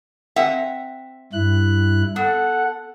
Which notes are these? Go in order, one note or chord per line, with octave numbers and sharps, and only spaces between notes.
C4 E5 F#5
G2 E4 F#6
B3 A4 F#5